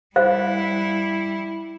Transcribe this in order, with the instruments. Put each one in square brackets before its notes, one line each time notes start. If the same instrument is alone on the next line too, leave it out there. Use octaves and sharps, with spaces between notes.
[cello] G3 E4 [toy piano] C5 F5